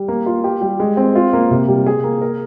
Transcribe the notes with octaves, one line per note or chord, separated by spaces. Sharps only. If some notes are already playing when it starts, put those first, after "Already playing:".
Already playing: G3
A#3
F4
G4
G3
G#3
C4
F4
A#3
C3
G3
G#4
A#3
A#4